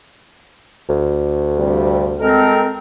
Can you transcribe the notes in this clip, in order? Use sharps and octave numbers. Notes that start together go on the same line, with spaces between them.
D2
G2 C3 G3
G#3 C4 A4 A#4